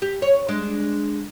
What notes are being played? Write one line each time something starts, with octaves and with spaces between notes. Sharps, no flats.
G4
C#5
G#3 D4